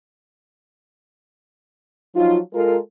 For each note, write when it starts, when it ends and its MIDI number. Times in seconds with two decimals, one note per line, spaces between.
2.15 2.38 53
2.15 2.38 54
2.15 2.38 63
2.15 2.38 65
2.53 2.77 56
2.53 2.77 65
2.53 2.77 69
2.53 2.77 70